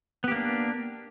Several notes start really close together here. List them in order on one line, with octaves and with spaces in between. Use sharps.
B3 G4 A#3 D4